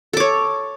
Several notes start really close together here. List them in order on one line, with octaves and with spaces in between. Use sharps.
A4 D6 C#5